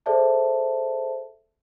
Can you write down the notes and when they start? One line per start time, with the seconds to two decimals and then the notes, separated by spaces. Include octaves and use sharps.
0.06 G#4 A4 C5 D5 E5 A5